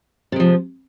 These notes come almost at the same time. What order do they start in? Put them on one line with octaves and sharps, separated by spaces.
C3 G#3 F3